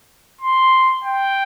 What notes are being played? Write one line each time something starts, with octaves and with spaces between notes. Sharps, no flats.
C6
G5